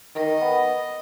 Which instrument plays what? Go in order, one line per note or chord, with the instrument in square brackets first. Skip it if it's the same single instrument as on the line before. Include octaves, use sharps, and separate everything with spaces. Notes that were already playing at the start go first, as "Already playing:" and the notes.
[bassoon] D#3 [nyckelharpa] D#5
[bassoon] B3